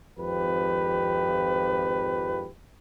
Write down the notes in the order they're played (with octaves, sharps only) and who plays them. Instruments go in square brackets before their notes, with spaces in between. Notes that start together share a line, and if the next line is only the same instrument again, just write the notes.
[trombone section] G#1 F2 F3 G4 B4